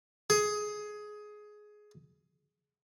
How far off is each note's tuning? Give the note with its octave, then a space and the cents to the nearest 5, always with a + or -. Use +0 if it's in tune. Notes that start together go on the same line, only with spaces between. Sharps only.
G#4 +15